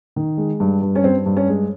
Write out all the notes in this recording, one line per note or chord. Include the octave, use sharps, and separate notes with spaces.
D#3
G#3
G2
G2
C#4
G2 C4
G2
C#4
G#3